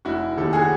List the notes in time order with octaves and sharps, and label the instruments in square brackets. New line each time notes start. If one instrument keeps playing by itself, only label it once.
[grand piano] F1 E4 F#4
D#2 D#3 G4 A4
F#4 G#4